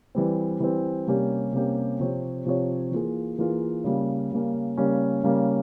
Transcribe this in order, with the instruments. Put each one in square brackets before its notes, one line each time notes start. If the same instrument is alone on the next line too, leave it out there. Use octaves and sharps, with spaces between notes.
[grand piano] E3 G3 C4
E3 G3 C4
C3 G3 A#3 C#4 G4
C3 G3 A#3 C#4 G4
C3 F3 C4 G4 C#5
C3 F3 C4 G4 C#5
E3 A#3 F4 G#4
E3 A#3 F4 G#4
C#3 G3 A#3 C#4
C#3 G3 A#3 C#4
C#3 G3 A#3 C#4
C#3 G3 A#3 C#4